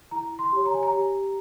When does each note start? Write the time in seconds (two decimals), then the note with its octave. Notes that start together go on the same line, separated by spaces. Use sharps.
0.11 E4 A#5
0.39 C6
0.52 G4 C#5
0.66 A#5
0.74 G#5
0.83 A#5
0.93 G4